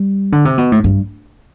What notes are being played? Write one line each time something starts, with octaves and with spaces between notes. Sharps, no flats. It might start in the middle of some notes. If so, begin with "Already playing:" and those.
Already playing: G3
D3
C3
B2
A2
G2